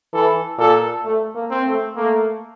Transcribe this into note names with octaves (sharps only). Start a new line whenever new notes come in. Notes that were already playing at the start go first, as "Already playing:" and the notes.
E3 A4
A#2 A4
A3
A#3
C4
A3
A3 A#3